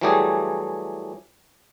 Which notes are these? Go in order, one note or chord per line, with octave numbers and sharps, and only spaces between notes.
E3 F#3 G3 A3 G4 G#4